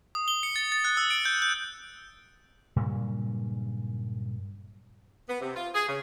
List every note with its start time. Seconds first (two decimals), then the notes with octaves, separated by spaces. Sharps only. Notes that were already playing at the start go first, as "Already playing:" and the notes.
0.15 D#6
0.28 G7
0.43 C#7
0.56 A6
0.72 A6
0.84 F#6
0.97 E6
1.10 D7
1.25 G6
1.42 G6
2.76 G2 A#2 C#3 F#3
5.28 B3
5.41 C3
5.56 F4
5.74 G#4
5.87 C#3